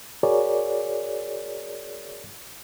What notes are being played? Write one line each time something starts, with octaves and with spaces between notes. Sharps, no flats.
F#4 G#4 A#4 C#5 D5